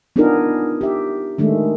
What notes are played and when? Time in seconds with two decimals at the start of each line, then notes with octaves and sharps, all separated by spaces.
0.16 B3 D4 D#4 F4 G#4 A#4
0.81 G4 E5
1.38 D#3 G#3 A3 D4